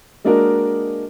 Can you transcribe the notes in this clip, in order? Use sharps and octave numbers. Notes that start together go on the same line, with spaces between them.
G#3 A#3 D4 F#4 A#4 D#5